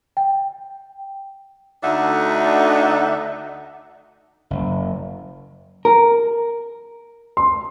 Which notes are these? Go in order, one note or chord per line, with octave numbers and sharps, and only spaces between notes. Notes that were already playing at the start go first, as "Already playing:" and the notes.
G5
D2 D3 D4 D#4 E5 F#5
F#1
A#4
C6